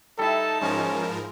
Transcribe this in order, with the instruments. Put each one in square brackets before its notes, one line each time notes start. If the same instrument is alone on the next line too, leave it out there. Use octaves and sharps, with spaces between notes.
[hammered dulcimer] G3 E4 [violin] D#4 A5 [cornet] A4
[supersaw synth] G#2 F3 A#4 [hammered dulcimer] G#3 [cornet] C#4